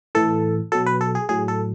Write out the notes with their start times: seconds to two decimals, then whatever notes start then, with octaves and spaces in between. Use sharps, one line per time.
0.15 A2 E3 A4
0.72 B2 F#3 A4
0.86 B4
1.01 A4
1.15 G#4
1.29 A2 F#3 G#4
1.48 A4